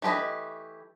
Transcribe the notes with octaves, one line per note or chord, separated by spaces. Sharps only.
E3 A3 G4 B4 D#5